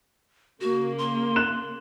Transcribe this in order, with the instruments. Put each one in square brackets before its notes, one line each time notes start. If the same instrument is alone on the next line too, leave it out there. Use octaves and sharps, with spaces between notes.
[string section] C#3 A#3 [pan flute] F#4
[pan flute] C6
[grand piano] F#6 E7